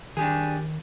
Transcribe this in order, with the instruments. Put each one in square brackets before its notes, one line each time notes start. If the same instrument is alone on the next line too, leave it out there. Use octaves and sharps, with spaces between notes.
[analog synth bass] D#3 [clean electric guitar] D4 G4 G#4